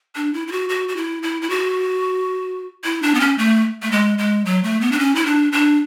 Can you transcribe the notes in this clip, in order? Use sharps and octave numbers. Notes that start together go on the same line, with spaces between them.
D4
E4
E4
F#4
F#4
F#4
E4
E4
E4
F#4
E4
D4
B3
C#4
A3
A3
G#3
G#3
F#3
A3
B3
D4
C#4
E4
D4
D4